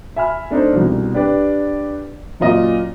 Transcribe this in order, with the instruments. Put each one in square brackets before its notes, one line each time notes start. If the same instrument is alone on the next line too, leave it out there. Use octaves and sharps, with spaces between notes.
[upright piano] E5 G#5 B5 F6
A3 D4 D#4 A4 C5
C2 B2
D4 G4 B4 D5
F#2 A#2 F4 D#5